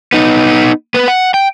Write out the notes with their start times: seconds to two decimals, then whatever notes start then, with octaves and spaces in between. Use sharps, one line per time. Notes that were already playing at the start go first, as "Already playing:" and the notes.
0.13 B3 D#4
0.94 B3 B4
1.08 F#5
1.34 G5